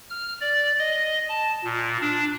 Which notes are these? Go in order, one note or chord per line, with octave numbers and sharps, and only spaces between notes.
F6
D5
D#5
A5
A#2
D4